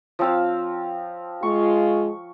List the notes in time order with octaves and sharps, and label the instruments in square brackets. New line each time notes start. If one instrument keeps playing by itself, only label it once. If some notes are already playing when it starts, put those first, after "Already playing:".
[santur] F3 C4 F5
[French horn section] G#3 F4 [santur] C#6